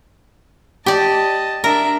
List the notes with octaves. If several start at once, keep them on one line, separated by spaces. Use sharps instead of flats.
G4 D5 D#5 A5
D4 A#4 E5